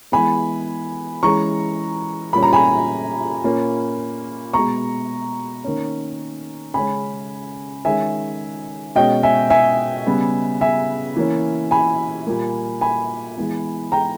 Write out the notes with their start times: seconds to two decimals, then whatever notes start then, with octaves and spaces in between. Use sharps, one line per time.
0.12 E3 G#3 B3 G#5 B5
1.23 E3 G#3 C#4 A#5 C#6
2.33 A#2 G3 C#4 B5
2.43 A#5
2.53 G#5 B5
3.44 A#2 A#3 C#4
4.53 B2 G#3 B3 A#5 C#6
5.64 D#3 A#3 C#4
6.74 C#3 G#3 C#4 G#5 B5
7.85 D#3 G#3 C#4 E5 G#5
8.95 B2 G#3 C#4 D#5 G5
9.23 E5 G#5
9.50 E5 G#5
10.07 C#3 G3 B3
10.61 E5 G#5
11.16 E3 A#3 C#4
11.71 G#5 B5
12.27 A#2 G3 A#3
12.81 G#5 B5
13.38 E3 G#3 B3
13.92 G5 A#5